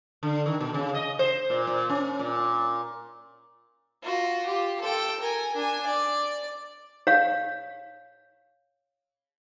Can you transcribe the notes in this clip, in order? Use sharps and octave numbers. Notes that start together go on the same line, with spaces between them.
D3
D#3
B2
C#3
D#5
C5
A#2
A#2
C#4
A#2
F4 F#4
F4 G4
A4 G5
A#4 G#5
D4 G#5
D5
C#5 F5